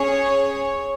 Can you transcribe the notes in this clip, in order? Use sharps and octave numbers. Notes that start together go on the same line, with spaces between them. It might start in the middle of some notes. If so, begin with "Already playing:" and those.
Already playing: C#4 G#4 C#5